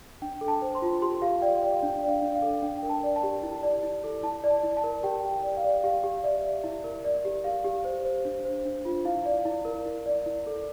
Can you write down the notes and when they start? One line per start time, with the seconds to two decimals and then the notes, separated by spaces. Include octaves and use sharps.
0.22 D4 G5
0.41 A4
0.48 A5
0.62 C5
0.75 C6
0.82 F4
1.02 G4 C6
1.22 G4 F5
1.42 D5 G5
1.62 D5
1.72 F5
1.82 D4 G5
2.03 D5
2.09 F5
2.22 D4
2.36 F5
2.42 A4
2.62 D4 G5
2.83 A#4
2.89 A5
3.03 D5
3.16 A5
3.23 G4
3.43 E4
3.63 D5
3.83 E4
4.04 A4
4.23 E4 A5
4.44 D5
4.50 A5
4.63 E4
4.77 A5
4.84 A#4
5.03 G4 G5
5.23 G4
5.43 D5
5.57 F5
5.64 D5
5.84 G4 F5
6.04 G4
6.24 D5 E5
6.44 D5
6.64 E4
6.84 A#4
7.05 D5
7.25 G4
7.44 G4 F5
7.64 G4
7.84 C5
8.05 C5
8.25 D4
8.45 C5
8.65 D4
8.85 F4
9.05 E4 F5
9.25 D5
9.45 E4
9.65 A#4
9.86 E4
10.06 D5
10.26 E4
10.46 A4